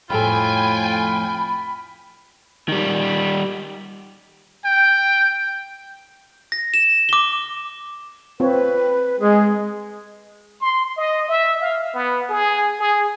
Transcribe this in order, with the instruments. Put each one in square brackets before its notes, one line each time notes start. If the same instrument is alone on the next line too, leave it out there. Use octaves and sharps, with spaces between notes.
[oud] F2 A2 A4 [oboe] F4 [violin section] G5 G#5 [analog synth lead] B5
[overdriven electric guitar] D#3 G3
[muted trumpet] G5
[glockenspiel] A#6
E7
D6 G7
[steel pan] C4 F4 C#5 [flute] B4
[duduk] G#3 [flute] G#4
[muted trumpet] C6
D#5
E5
F5
B3
G#4
G#4